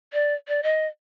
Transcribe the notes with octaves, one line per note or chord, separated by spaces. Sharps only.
D5
D5
D#5